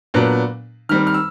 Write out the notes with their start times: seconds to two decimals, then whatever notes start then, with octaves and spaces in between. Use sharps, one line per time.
0.14 A#2 F#3 B3 D4
0.89 D#3 G3 C4 F6
1.07 F6
1.14 E6